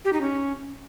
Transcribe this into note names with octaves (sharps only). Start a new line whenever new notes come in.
G4
D#4
C#4